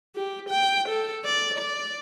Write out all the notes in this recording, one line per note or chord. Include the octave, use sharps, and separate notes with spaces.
G4
G5
A4
D5
D5